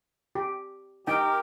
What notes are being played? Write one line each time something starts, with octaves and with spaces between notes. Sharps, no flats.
G4
D#4 G4 A#4 G5